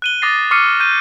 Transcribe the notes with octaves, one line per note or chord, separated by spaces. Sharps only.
F#6 D#7 G7
D6 D#6 A6 A#6 C7
C#6 D6 F6 C7 C#7 D#7
C#6 G6 D#7